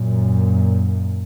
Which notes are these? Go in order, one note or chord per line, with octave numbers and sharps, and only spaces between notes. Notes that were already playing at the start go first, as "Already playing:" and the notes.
Already playing: F#2 A#2